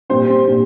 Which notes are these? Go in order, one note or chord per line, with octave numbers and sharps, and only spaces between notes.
A#2 G3 C4 C5
A#2 G3